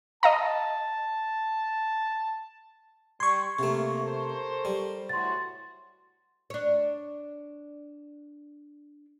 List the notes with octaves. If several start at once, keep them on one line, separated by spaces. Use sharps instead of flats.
D#5 F5 A5 A#5
G3 C6 C#6 G#6
C3 A3 A#3
A4 A#4 C5
G3
A2 E3 F#4 C6 A6
D4 C#5